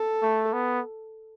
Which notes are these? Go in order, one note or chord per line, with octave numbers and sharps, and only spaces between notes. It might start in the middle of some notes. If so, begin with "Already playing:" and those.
Already playing: A4
A3
B3